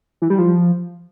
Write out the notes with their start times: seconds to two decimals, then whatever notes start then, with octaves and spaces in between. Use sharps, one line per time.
0.22 E3
0.30 G3
0.39 F3